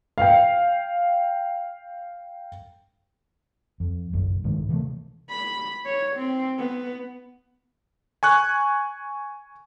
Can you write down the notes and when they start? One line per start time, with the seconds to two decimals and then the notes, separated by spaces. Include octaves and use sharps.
0.18 F5 G5
3.80 F2
4.13 F#1 B1 F#2
4.44 C2 G#2 D#3 G#3
4.69 C3 E3 F3 A3
5.30 B5
5.86 C#5
6.16 C4
6.58 B3
8.23 G#5 C#6 F#6